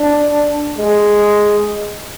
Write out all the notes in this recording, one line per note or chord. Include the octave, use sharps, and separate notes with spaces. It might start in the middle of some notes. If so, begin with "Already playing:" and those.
Already playing: D4
G#3